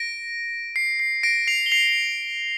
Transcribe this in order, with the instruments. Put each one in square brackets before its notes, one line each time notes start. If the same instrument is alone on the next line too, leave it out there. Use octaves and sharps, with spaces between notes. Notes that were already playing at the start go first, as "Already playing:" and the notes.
Already playing: [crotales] A#6 D7
C7
C7
A#6 D7
C7 F7
G7
C7 F7